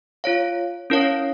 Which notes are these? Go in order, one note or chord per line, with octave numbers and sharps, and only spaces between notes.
F4 C#5 F5
C#4 E4 A#4 C#5 F5